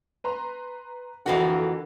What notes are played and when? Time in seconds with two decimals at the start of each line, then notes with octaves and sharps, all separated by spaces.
0.24 B4 A#5 C6
1.26 F2 D3 E3 A#3 F#4